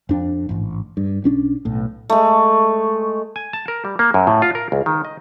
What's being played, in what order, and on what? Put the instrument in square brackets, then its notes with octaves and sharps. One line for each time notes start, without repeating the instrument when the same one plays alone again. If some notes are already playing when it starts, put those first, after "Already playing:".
[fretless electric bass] F2 D4
A1 G#2
G2
B1 C#4 D4
B1 A2
[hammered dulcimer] G#3 A3
[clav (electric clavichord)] G#5
A5
A#4
G3
A#3
F#2
A2
F4
A#4
C#2
D#3
D#5